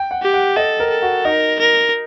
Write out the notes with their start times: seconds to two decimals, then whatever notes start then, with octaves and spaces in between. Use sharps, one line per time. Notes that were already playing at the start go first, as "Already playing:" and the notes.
Already playing: G5
0.11 F#5
0.23 G4
0.34 F#5
0.56 A4 D#5
0.80 A#4
0.91 A4
1.02 F#4
1.25 D#4 A#4
1.60 A#4